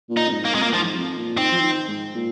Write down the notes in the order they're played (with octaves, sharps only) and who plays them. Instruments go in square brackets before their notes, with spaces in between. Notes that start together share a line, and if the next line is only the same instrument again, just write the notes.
[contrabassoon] A#2
[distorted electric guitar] D#4
[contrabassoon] F2
G#2
[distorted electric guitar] A#3
[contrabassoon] F2 [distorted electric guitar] G#3
[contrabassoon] A#2 [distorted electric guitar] A#3
[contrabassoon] G#2 [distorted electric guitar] F3
[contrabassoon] F2
A#2
[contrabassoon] D#3 [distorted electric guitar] C4
[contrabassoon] F3
D#3
G#2
A#2